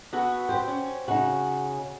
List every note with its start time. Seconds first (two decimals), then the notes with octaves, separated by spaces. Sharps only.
0.13 B3 F#4 A4
0.49 G4 C5
0.68 C#4
1.08 C#3 D#4 F#4